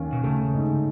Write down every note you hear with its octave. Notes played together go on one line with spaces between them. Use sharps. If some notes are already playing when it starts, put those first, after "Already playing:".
Already playing: D#2 C#4
B2
C#3 A3
G#2